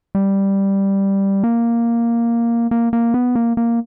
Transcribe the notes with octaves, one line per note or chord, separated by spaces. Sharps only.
G3
A#3
A#3
A#3
B3
A#3
A#3